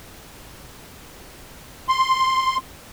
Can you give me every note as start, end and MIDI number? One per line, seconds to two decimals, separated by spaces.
1.88 2.57 84